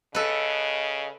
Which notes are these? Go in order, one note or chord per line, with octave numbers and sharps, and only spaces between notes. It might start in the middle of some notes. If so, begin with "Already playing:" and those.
C#3 A4 B4 D#5